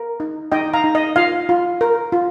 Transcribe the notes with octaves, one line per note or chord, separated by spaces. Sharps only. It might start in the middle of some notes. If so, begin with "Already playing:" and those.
Already playing: A#4
D#4
D#4 D#5 G5
F5 A#5
D#4
D#5
F4 F5
F4
A#4
F4